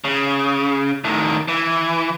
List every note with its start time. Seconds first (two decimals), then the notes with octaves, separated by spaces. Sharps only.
0.04 C#3
1.04 A2 D#3
1.48 E3